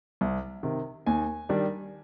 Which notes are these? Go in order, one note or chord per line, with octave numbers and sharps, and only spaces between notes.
C2
C3 D#3
D#2 G#5
D#3 G3 D4